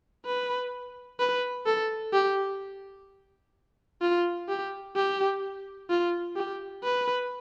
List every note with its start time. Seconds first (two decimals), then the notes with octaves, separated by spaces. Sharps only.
0.26 B4
1.20 B4
1.66 A4
2.13 G4
4.01 F4
4.48 G4
4.96 G4
5.89 F4
6.36 G4
6.83 B4